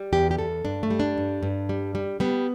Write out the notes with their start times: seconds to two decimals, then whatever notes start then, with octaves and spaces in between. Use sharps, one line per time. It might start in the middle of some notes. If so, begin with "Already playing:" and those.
Already playing: G3
0.13 E2 G4
0.31 G4
0.39 E2 A4
0.65 G2 D4
0.83 A3
0.90 G3
1.00 D4
1.18 G2
1.43 G2
1.69 G3
1.95 G3
2.20 G3 B3